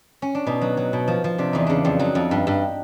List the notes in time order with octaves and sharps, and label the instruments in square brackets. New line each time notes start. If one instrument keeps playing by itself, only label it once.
[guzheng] C#4
D4
B2 D#4
F#3
F#3
B2
F3
F3
C3 D4
E2 D#4
C#3 D4
F2
F#3 D#4
F2
G2
G2